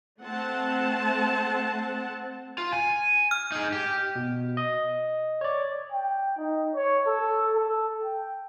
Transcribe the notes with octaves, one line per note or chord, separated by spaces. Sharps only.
A3 C4 F#5 A5
F4
G#5
F6
D#4 G#4
G4
B2
D#5
C#5 D5
G5
D#4
C#5
A4
A4
G5